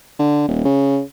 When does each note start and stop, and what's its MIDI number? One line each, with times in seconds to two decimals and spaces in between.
0.20 0.46 50
0.48 0.62 27
0.65 1.01 49